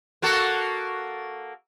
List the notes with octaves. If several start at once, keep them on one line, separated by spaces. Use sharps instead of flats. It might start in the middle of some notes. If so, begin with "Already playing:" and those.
A#3 F#4 A4